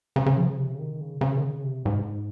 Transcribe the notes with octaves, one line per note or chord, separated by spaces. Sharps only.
C#3
C#3
F3
C#3
C3
C#3
D#3
C#3
C#3
D#3
C#3
C3
G#2